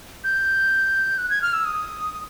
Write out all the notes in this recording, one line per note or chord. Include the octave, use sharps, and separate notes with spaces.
G6
F#6
G#6
F6
E6
D#6
D#6